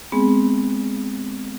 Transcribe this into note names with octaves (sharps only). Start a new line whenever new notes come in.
G#3 B3 C4 G#4